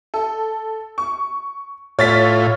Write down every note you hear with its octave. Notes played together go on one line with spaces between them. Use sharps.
A4
C#6
A2 F4 C#5 A6 B6